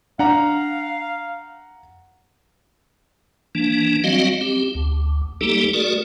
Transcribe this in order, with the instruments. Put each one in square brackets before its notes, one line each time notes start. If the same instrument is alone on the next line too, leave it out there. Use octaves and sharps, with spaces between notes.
[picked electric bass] D4 [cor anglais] F5 [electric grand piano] F#5 A#5
[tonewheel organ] E3 A#3 D4
F#3 G3 C4 F#4 D#5 F5
C4 G4
D2
G3 A3 A#3 D#4 G4 A4
A3 F#4 G#4 A#4 D5